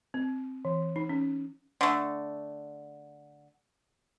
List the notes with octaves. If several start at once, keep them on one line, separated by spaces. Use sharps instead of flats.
C4
E3
D#4
C#4
D3 A3